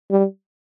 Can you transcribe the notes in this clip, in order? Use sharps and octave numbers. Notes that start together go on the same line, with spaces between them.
G3